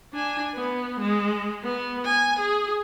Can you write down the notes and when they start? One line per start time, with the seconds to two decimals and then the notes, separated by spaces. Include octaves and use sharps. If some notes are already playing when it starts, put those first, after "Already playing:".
0.13 D4 G#5
0.55 B3
1.00 G#3
1.64 B3
2.06 G#5
2.39 G#4